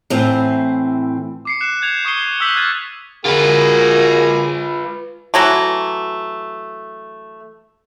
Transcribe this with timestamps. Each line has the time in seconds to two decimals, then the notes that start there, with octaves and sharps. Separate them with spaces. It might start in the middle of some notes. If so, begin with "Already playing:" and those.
0.10 A2 E3 C4
1.45 D6 C7 C#7
1.61 F#6 C#7 E7
1.82 G6 G#6 F7
2.05 C#6 D#6 C7 C#7 D#7 G7
2.40 D6 E6 F#6 G6 B6 F#7
2.56 F6 F#6 G#6 A6 D#7
3.25 A#3 F4 F#4 G#4 B4
5.34 E3 F#3 A3